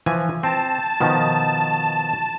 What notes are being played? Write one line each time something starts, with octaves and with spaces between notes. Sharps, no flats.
E3 F3 G#5
C4 A5
B2 D#3 F3